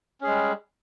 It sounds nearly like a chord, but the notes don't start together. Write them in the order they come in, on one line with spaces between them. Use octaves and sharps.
C#4 G#4 G#3 G3